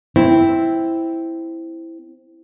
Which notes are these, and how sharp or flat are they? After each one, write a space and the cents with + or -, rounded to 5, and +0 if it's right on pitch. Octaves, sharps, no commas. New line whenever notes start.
C4 +0 E4 +0